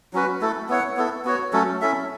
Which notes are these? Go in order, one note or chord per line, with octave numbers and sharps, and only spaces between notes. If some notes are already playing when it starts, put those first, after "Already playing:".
F#3 C#4 F#4 B4
A3 E4 A4
B3 E4 C#5 F#5
B3 E4 A4
B3 F#4 C#5
F#3 A3 C#4 A4
C#4 E4 A4 E5